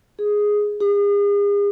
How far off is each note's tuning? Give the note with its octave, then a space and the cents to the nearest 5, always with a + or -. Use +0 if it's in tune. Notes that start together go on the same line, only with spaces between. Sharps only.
G#4 +0
G#4 -40